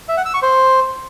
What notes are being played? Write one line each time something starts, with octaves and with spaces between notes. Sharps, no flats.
E5
F#5
E6
C#6
C5